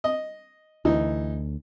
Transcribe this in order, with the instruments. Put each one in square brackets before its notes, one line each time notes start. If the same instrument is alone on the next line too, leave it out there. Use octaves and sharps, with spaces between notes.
[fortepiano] D#5
[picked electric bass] D2 [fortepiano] E3 D#4